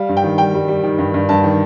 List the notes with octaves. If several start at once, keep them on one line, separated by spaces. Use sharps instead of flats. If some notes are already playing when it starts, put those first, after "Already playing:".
Already playing: G3 F5
G2
G5
D#3
G3 G5
G3
G3
D#3
G2
G2
G2 A5
D#3